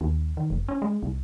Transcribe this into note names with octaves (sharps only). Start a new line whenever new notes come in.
D#2
D#3
F1
C#4
G#3
C2